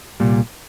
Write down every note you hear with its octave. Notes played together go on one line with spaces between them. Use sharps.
C2 A#2 G3